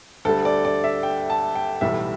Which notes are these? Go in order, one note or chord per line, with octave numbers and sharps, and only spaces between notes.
D2 D3 G3 A4
D5
D5
E5
G5
A5
G5
B1 A2 E3 G3 E5